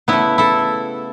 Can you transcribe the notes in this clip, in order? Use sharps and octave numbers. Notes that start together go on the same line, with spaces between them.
C#3 A3 B3 E4
E4 A4